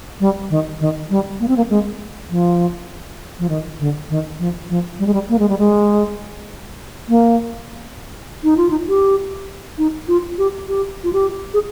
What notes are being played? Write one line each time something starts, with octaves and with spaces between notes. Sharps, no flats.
G3
D#3
D#3
G3
A#3
C4
A#3
G#3
F3
F3
D#3
D3
D#3
F3
F3
G3
G#3
G3
A#3
G#3
G3
G#3
A#3
D#4
F4
D#4
G4
D#4
F4
G4
G4
F4
G4
G#4